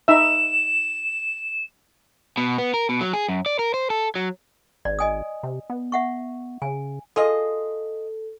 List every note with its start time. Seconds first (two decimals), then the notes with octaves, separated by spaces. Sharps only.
0.08 D#4 E5 E7
2.37 B2
2.58 B3
2.74 A#4
2.89 B2
3.01 F#3
3.13 G#4
3.29 F#2
3.46 D5
3.59 A#4
3.74 C5
3.90 A4
4.15 F#3
4.85 G#1 D5
4.99 D#5 G#5 D#6
5.43 C3
5.70 B3
5.92 E5 F#5 C#6
6.62 C#3 G#5
7.16 F4 G#4 A4 D#5